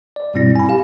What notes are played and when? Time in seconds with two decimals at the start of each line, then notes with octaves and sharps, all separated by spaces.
0.16 D5
0.34 G2 B2 G3 C4 E4 A#6
0.56 G#5 B5
0.69 G4 F5